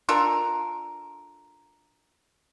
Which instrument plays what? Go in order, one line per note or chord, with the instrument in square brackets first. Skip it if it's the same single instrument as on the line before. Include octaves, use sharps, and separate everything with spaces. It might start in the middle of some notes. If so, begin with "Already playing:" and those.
[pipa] D4 F4 A4 A#4